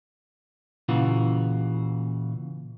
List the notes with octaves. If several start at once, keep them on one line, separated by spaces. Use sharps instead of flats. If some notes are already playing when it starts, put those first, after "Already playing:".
A#2 C#3 E3 F4 F#4